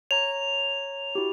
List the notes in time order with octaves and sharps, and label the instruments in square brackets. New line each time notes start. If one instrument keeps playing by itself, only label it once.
[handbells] C#5 A#5 [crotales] F7
[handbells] E4 F#4 G4